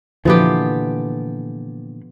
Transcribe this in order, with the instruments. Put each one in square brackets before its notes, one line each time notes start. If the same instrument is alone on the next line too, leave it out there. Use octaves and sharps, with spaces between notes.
[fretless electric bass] A#2 D3 E3 [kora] F3 B3 G4